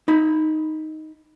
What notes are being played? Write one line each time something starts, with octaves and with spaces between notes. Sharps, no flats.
D#4 B5